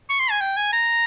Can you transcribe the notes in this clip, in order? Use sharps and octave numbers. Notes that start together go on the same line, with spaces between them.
C#6
C6
G#5
G5
G#5
A#5